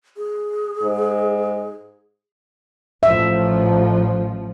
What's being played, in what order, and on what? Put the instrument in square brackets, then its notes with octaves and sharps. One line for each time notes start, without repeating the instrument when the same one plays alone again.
[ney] G#4
[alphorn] G#2
[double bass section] A1 F3 [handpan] E5